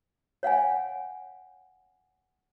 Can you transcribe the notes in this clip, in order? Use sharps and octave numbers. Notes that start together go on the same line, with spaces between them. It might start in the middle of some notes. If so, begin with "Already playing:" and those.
C#5 F5 F#5 G#5